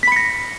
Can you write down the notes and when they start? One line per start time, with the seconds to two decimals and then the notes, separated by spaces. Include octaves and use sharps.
0.03 B6
0.07 B5
0.12 C#7
0.16 A#6